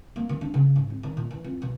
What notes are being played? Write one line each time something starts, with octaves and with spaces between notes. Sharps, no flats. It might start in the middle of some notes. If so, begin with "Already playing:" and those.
A#3
D#3
D4
C#3
G#2
G#1
D#3
A#2
E3
F2
B2